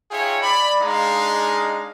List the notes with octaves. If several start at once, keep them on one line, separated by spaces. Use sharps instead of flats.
D#4 F4 G#4 C#5 E5 G5
D5 B5
G#3 D4 D#4 G#4 F5 A#5